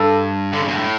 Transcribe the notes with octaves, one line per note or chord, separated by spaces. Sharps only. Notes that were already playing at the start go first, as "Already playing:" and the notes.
Already playing: G2 A4
D3
C#3
B2
A2